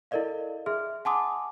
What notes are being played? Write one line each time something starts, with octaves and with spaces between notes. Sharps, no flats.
E4 A4 A#4 D5 D#5 F5
G#4 E5 C6 F6
F#5 G#5 A5 C6 D6 D#6